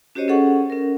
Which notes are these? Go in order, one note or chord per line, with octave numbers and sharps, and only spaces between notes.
C#4 F#4 G4 C5 C#5 D#5
C#4 G#4 A4 F#5 C#6
C#4 A#4